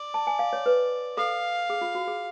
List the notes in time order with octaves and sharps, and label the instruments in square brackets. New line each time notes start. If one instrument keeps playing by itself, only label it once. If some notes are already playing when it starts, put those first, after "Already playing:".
Already playing: [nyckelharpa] D5
[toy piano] A5
G#5
F5
C#5
B4
[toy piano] A4 [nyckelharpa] F5
[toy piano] G#4
F4
F#4
G#4